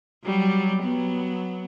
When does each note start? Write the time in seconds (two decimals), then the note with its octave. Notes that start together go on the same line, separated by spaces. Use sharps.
0.24 F#3 G3
0.82 F#3 B3